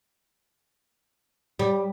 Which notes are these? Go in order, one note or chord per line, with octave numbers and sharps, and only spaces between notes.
G3